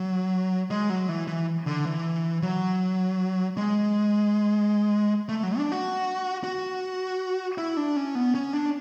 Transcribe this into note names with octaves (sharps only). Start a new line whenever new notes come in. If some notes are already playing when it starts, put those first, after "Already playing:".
Already playing: F#3
G#3
F#3
E3
E3
D3
E3
F#3
G#3
A3
F#3
D4
F#4
F#4
E4
D4
C#4
B3
C#4
D4